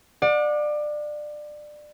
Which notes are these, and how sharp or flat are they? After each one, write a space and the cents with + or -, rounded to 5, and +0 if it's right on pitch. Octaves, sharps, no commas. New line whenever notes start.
D5 +25 F#5 -35